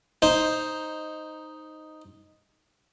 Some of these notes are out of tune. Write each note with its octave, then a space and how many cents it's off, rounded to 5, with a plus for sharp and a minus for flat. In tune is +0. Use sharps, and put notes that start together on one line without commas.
D#4 +0 C5 +0